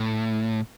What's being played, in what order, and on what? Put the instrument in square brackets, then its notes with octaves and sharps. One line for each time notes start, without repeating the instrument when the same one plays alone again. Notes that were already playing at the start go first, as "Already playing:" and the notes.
Already playing: [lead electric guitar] A2